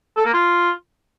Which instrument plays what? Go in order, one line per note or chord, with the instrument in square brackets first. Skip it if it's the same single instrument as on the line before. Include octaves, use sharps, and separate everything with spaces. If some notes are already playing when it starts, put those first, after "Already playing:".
[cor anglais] A4
A#3
F4